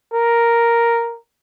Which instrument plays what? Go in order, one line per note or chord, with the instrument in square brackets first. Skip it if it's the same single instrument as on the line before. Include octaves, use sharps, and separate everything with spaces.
[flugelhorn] A#4